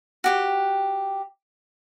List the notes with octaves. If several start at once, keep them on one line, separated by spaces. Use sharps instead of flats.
F#4 G4 G5